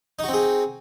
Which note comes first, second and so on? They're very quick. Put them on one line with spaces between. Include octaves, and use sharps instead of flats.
D#4 F#4 C4 G#4